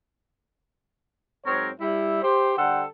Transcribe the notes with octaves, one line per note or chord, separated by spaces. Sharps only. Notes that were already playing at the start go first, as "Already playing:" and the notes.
G#2 F#3 C4 A#4 C#5
G3 E4
G4 C5
D3 G3 A4 C5 F#5 G5